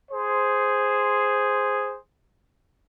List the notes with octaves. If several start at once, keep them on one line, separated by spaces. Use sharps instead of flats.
G#4 C5